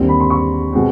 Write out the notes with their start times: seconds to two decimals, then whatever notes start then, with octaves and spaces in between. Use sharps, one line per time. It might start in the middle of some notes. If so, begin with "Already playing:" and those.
Already playing: D#2 D3 G3 C4
0.09 B5
0.20 C6
0.30 C#6
0.73 B2 G#3 C4